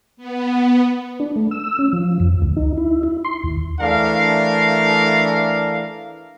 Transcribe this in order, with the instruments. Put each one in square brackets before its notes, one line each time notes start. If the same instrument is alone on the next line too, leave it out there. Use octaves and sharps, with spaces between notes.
[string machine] B3
[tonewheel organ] D4
A3
E6
C#4
F3
F2
D2
D#4
E4
E4
C6
D#2
[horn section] E3 A3 D4 A#4 F5